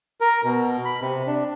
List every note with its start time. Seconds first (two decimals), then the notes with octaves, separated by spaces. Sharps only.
0.21 A#4
0.44 B2
0.85 B5
1.02 C3
1.27 D4